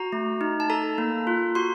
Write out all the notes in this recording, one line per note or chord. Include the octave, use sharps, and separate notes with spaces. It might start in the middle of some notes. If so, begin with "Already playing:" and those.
Already playing: F#4 A#5
A3
D#4
A5
A4 A#5
A#3
F4
F#4 C6